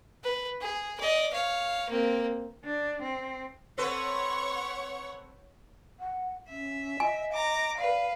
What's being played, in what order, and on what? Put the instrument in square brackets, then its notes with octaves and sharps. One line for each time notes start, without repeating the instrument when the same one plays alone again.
[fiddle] B4
G#4
D5 D#5
C#5 F5
A#3 C4
[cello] D4
C4
[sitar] C4 A4 B4 [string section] C#5 F#5 C#6
[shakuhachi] F#5
[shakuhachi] C#4 [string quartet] E5
[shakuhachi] D#5 [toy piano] G#5
[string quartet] A#5 D6
[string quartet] B4 F5 [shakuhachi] D5